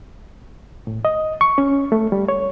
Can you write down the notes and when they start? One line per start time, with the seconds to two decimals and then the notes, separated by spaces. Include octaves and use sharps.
0.87 A2
1.05 D#5
1.41 C#6
1.58 C#4
1.92 A3
2.12 G3
2.28 C#5